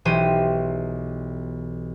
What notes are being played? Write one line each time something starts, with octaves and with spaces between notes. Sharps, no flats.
B1 E3 G4 C5 D#7